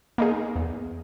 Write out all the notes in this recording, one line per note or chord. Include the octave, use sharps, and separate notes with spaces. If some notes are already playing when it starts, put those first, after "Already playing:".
A#3 D#4 G#4
E2